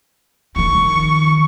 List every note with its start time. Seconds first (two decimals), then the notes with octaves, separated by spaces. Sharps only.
0.56 D#3 F3 C#6